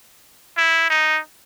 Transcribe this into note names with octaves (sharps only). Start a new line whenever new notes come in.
E4
D#4